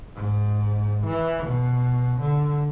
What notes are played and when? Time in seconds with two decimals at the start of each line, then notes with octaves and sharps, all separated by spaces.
0.15 G#2
1.06 E3
1.46 B2
2.21 D3